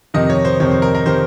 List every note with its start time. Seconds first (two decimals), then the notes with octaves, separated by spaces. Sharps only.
0.14 F2 C3 D#3 D#5
0.30 C#5
0.45 C5
0.60 F2 C3 D#3 C#5
0.71 C5
0.82 A#4
0.95 A#4
1.06 C3 D#3 C5